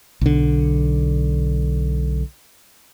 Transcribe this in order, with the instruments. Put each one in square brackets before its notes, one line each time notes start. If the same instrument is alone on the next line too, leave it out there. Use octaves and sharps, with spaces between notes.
[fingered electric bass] B1 D3